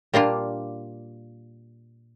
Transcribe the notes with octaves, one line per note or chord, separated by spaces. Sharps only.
A#2 G3 A#3 D4 F4